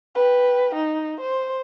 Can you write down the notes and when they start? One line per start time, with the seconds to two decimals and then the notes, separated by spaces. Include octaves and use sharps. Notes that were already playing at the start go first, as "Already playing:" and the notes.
0.15 B4 G5
0.75 D#4
1.20 C5